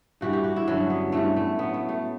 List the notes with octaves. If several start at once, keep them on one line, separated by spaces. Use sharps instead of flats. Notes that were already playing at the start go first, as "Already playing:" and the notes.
G2 E3 G3 F#4
G4
F#4
E4
G2 D3 F#3 C#4
B3
G2 E3 G3 A3
A3
A2 F#3 B3
A3
A3